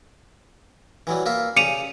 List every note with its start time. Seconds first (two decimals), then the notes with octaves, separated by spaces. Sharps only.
1.07 E3 F#3 G3
1.26 A#3 F4 E5
1.57 C#3 G4 D5 C#7 D#7 F7